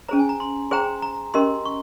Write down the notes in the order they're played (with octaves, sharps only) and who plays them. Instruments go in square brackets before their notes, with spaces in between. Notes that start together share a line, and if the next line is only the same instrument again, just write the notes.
[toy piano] C#4 G#4 C5 [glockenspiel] A#5
[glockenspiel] G#5
A#5
C6
[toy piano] G#4 C5 G5 A#5 [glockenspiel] C6
[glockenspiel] A#5
[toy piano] C#4 G4 A#4 D#5 [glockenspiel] C6
[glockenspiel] C#6